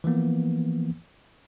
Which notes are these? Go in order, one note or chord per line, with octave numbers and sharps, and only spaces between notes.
E3 F3 A#3 B3